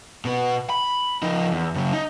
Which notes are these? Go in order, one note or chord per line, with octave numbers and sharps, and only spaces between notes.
B2 B3
B5
F3 D#4
E2
C#3 F#3
D#4